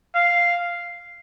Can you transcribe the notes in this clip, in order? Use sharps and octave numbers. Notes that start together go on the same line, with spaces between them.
F5